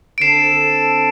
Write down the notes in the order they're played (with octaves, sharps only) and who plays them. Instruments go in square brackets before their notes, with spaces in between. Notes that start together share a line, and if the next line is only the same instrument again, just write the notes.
[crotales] D7
[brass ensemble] D3 C4 A4 [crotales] C7 E7